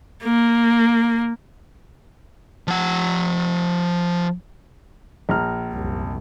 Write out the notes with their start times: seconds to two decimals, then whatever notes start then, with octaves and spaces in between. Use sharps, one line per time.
0.24 A#3
2.68 F3 F#5
5.29 A#1 A#5 F6
5.72 C2 F#2